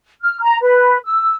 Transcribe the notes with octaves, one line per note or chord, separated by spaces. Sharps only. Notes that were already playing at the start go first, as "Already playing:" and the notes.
F6
A#5
B4
E6